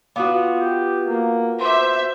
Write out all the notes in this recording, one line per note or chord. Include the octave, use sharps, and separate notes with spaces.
B3 F4 F#4 F5 D6 D#6
G4
A#3
C5 E5 C6 D6